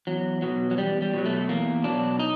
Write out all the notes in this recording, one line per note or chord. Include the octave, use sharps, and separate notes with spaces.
E2 F#3
B2 F#3
F#3
E2 G3
G3
B2 F#3
A3
E2 A#3
B2 F#3 D4
D#4